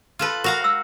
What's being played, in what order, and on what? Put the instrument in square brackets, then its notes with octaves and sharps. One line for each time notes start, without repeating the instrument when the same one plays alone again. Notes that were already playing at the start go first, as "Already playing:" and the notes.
[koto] F4 A4 B4
[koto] F#4 F5 A#5 [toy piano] A#4
[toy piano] F#5 E6